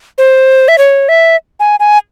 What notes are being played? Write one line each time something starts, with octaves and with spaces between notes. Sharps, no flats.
C5
E5
C#5
E5
G#5
G#5